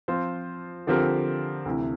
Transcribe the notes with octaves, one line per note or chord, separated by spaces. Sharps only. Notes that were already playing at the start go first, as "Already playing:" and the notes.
F3 C4 F4 C5
D3 F3 C4 G4 A#4
D2 C3 E3